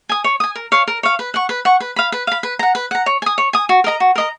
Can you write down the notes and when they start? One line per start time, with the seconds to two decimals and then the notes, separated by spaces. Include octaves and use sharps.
0.09 G#5 D#6
0.24 C#5
0.40 G#5 D#6
0.56 A#4
0.72 C#5 F5
0.88 A#4
1.03 C#5 F5
1.19 B4
1.34 F#5 C#6
1.49 B4
1.65 F#5 C#6
1.80 B4
1.96 F5 B5
2.12 B4
2.27 F5 B5
2.43 B4
2.59 F#5 A#5
2.75 B4
2.91 F#5 A#5
3.06 C#5
3.22 G#5 D#6
3.38 C#5
3.53 G#5 D#6
3.69 F#4
3.84 A#4 D#5 A#5
4.00 F#4
4.16 A#4 D#5 A#5